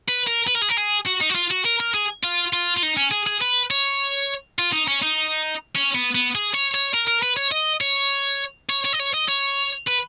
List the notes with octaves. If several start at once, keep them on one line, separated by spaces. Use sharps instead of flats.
B4
A#4
B4
A#4
G#4
A#4
G#4
F#4
D#4
F#4
F4
F#4
A#4
A#4
G#4
F4
F4
F4
D#4
C#4
G#4
G#4
B4
C#5
F4
D#4
C#4
D#4
C#4
B3
B3
G#4
C#5
C#5
A#4
A#4
B4
C#5
D#5
C#5
C#5
C#5
D#5
C#5
D#5
C#5
B4